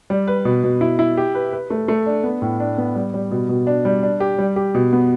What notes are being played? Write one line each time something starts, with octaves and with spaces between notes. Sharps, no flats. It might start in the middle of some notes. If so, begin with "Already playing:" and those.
G3
B4
B2
B2
E4
E4
G4
B4
B4
A3
A3
D4
B3
A2
D4
B3
G3
G3
B2
B2
D4
G3
D4
G4
G3
G4
B2
B3